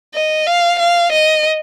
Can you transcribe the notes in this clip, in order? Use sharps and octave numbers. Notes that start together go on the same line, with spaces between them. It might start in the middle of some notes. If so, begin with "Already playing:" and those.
D#5
F5
F5
D#5